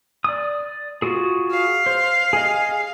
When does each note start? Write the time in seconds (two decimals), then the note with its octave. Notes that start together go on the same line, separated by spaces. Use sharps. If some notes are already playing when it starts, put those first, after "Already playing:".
0.24 D5 D#6
1.02 F4 F#4 G#4
1.51 F5
1.86 C5
2.33 G#4 D#5